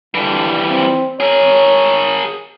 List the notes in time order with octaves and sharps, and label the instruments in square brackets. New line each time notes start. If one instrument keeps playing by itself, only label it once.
[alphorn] D3 [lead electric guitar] E3 G3
[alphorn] C4
[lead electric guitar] G#4 A#4 [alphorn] C#5